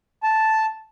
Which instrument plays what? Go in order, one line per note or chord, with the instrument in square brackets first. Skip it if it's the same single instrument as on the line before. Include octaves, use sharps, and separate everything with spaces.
[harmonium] A5